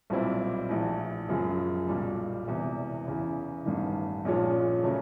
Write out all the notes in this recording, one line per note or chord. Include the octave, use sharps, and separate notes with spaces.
B1 A#2 G3 C4 E4
A#1 A2 E3
F#2 C#3 F3 G#3
B1 A#2 G3
E1 E2 C3
E2 C#3 E3
A1 G2 D#3
A#1 A#2 F3 G#3 C#4
C#3 F#3 A3